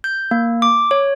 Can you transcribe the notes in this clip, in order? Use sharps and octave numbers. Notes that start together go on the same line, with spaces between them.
G6
A#3
D6
C#5